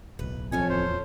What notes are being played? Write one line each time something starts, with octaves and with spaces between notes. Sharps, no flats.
D1 B1 B4
F2 A3 C#4 C#5 G#5
D1 E2 C5